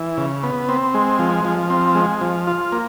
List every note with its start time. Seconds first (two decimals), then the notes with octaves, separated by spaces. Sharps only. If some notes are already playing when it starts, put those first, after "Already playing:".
Already playing: E3
0.18 C#3
0.43 B3
0.69 C4
0.94 G#3
1.19 F3
1.45 F3
1.70 C4
1.95 G#3
2.21 F3
2.47 F4
2.72 A#3